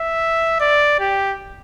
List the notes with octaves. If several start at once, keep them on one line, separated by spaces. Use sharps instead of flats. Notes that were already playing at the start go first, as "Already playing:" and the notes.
Already playing: E5
D5
G4